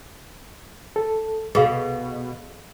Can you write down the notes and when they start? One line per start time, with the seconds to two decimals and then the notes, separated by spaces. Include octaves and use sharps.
0.96 A4
1.55 C2 B2 G#4 A4 F5